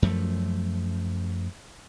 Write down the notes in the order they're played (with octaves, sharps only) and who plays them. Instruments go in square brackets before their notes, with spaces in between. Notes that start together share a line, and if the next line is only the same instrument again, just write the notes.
[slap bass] F#2 F3 A3